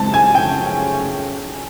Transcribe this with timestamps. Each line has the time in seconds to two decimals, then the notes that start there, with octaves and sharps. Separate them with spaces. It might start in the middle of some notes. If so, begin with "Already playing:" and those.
Already playing: F#2 C#3 E3 G#3 C4 A5
0.14 G#5
0.35 F#2 C#3 F3 A3 C#4 G5